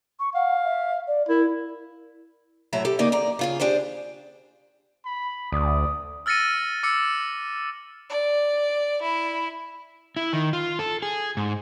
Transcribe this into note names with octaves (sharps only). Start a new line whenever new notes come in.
C#6
F5 F#5
E5
D5
E4 A#4
A2 F#3 E5 A#5
G4 A4
D#2 C#3 A#3 D#4 G#4 D5
E2 D5 A#5
C#3 F4 G#4
D4 G4 G#4 C5
B5
D2 D5 D#6
E6 F6 A6 A#6 C#7 D#7
D6 E6 C#7
D5
E4
E4
D#3
F4
A4
G#4
G#2